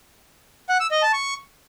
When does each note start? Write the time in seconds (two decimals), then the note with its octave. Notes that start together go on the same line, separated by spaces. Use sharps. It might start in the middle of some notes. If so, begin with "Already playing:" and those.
0.69 F#5
0.80 E6
0.91 D#5
1.02 A5
1.13 C#6